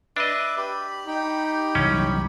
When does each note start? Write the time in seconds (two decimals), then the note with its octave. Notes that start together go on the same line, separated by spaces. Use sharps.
0.17 D4 B4 D#5 E5 D6
0.58 G4 B5
1.07 D#4 G5
1.75 C2 F#2 E3 C#4